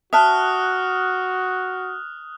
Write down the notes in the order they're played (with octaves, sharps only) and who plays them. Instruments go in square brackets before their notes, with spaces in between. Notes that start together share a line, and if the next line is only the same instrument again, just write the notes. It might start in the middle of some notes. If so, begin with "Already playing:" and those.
[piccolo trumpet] F#4 [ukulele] E5 A5 [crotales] D#6 F6 F#6